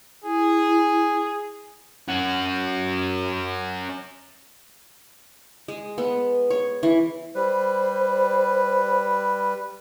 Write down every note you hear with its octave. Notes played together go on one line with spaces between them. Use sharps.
E4 G#4
C#4 F#4
G#3
B3
C#5
E3
G3 B4 C5